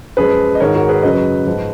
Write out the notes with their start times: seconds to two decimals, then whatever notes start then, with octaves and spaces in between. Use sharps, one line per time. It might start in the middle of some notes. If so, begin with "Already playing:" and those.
0.17 F#2 F3 G#3 G#4 B4
0.55 D#5
0.60 G#2 D#3 G#3 A#4 C#5
0.75 F#4 A#4
0.89 G#4 B4
1.03 F#2 C#3 F#3 B4 D#5
1.46 G#2 F3 G#3